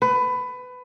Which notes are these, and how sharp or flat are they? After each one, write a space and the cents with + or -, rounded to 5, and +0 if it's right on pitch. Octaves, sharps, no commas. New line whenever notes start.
B4 +20